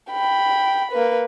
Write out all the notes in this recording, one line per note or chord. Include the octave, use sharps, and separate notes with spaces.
G5 B5
A#3 B4